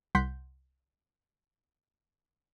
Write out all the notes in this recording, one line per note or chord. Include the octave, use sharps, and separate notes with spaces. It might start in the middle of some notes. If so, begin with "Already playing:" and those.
C2 F#5 C6 G6 B6